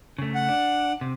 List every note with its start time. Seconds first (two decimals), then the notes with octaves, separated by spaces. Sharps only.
0.18 C#3 A3
0.35 F#5
0.49 D4
1.01 C3